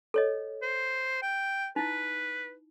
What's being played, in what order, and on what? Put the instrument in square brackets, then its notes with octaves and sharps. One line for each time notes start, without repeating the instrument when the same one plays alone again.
[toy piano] A4 C#5 D#5
[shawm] C5
G5
[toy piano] D#4 E4 [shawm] B4